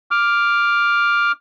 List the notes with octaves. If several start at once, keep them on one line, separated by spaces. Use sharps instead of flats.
D6 F6